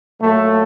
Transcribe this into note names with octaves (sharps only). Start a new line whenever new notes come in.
A#2 F#3 A3